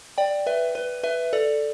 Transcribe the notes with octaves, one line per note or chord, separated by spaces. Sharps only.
D5 G5
B4 E5
B4
B4 E5
A4 D5